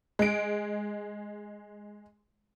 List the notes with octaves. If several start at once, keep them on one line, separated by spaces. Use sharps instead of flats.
G#3 D7